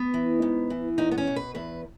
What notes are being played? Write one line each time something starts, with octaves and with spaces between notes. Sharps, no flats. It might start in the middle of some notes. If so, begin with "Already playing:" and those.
Already playing: B3
E3
G#2
E3
E2 D#4
B3
C#4
B2
B4
E2 B4